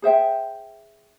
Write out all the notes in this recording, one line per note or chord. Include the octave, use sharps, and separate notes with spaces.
G#4 C5 E5 G5